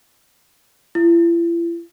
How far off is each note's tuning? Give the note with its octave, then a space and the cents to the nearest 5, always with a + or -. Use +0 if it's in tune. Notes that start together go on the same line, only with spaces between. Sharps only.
E4 +45